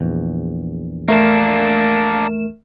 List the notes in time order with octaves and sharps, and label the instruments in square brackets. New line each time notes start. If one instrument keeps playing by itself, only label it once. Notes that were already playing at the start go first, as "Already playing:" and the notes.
[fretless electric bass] A#1 E2
[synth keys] A3 A#4 E7 [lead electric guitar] A#3 D4